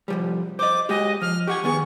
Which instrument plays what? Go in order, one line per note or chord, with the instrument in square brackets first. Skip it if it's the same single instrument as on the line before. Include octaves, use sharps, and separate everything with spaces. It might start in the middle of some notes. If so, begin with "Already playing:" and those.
[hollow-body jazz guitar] C2 F3 G3
[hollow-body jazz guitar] C5 D#5 [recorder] D6
[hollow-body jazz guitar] G#3 F#4 G4 [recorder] D#5
[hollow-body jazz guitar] F3 [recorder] F6
[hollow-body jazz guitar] G4 F#5 G#5 [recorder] C#6
[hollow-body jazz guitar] D#3 B3 G#4 [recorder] C#6